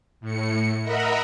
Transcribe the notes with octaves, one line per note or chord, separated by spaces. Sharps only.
A2 C#7
A#4 D#5 E5 F#5 A#5 B5